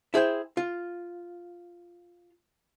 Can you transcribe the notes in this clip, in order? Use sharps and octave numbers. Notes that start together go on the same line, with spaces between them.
E4 G#4 C5 G5
F4